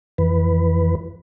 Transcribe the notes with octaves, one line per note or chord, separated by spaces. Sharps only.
F2 E3 B4